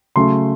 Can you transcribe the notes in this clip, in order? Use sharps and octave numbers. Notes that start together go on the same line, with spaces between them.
C#3 F#3 A3 C6